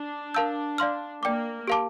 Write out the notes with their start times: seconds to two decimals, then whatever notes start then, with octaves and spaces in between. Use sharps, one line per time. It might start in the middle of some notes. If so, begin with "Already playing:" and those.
Already playing: D4
0.34 A#4 F5 A5 E6 G6
0.78 D5 F5 C6 F6
1.23 A#3 D5 G5 D6
1.68 G4 A#4 F5 A5 D6